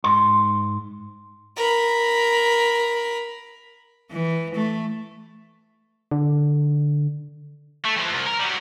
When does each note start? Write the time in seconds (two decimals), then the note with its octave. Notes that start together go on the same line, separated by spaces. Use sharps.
0.04 G#2 C6
1.56 A#4 B5
4.11 E3
4.55 A3
6.11 D3
7.85 A3
7.97 E3 F3
8.11 C2
8.27 A#4
8.40 F#3 G3